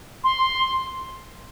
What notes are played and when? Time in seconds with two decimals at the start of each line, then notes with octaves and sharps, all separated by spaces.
0.24 C6